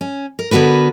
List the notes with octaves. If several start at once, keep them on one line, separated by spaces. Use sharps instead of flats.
C#4
A#4
D3 B3 F#4 A#4 B4